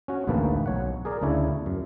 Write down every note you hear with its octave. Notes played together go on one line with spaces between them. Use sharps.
C#4 F#4
A1 D2 G#2 A#3 B4 A5
B1 C#5 F#5
G#4 A#4 D5
D2 C#3 D4 E4 C#5 G#5
F#2